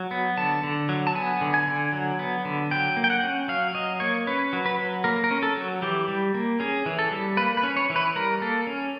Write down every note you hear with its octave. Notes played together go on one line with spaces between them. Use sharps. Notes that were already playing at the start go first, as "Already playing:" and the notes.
Already playing: F#3
B3
D3 A5
D3
F#3
A5
B3 G#5
D3
G#5
D3
F#3
B3
D3
F#3 G5
A#3
G5
F#5
C#4
F#3 F5
F#3 D#5
A#3 C#5
C#4 B4
F#3
B4
F#3
A#3 A#4
A#4
C#4
A4
F#3
E3 G4
G3
A#3
C#4 G#4
E3
A4
G3
A#3 B4
B4
C#4
C#5
E3
B4
G3 A#4
A#3 A4
C#4